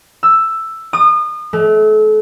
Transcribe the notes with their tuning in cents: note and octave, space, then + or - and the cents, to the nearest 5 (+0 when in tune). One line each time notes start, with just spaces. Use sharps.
E6 +5
D#6 -35
A3 -35